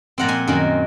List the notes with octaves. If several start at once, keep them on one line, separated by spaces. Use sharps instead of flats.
A#2 F3 C4 F#5 A#5
G#5 C6
F#2 D#3 F#3 A#3